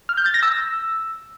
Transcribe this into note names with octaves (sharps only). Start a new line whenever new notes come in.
F6
G6
A6
A#6
E6